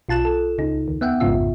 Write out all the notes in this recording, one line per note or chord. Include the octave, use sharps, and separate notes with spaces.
B1 F4 A5 F#6 E7
A4
C#2 C#3 D#4
D#2
B3 E5 F#5 G5
A1 F2 G#2 C#3 F4 E5